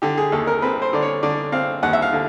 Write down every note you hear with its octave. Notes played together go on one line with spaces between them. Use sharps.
D3 G4
G#4
D#2 A4
A#4
C4 B4
C5
D3 D5
C#5
D3 D5
C4 F5
D#2 F#5
E5
F5
D3